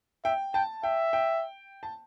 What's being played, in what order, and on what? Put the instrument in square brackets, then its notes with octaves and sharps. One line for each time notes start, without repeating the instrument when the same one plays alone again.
[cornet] E5 [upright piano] G5
[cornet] G5 [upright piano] A5
[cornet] E5 [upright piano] G5
[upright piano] G5
A5